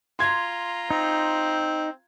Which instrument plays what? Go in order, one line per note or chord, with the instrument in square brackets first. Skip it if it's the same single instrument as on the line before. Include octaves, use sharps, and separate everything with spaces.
[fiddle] F4 A#5 [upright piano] C6 G#6
[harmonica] C4 [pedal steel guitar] D#4